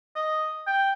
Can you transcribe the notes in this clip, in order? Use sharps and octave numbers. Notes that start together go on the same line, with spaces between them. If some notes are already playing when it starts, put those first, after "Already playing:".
D#5
G5